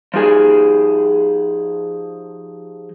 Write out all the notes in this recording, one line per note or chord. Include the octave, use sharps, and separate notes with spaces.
F3 D#4 G4 G#4 G#5